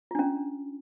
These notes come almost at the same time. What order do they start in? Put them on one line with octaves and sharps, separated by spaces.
F4 D4 C#4